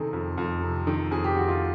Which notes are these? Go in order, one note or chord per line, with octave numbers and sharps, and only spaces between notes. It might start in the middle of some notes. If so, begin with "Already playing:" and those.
Already playing: C3 D#3 G#4 A4
F2
F2
C3
D#3
F2 G#4
G4
F2 F#4
F4